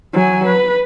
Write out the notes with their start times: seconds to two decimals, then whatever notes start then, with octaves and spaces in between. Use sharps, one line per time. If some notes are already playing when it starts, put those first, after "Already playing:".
0.13 F#3 G#5
0.45 B4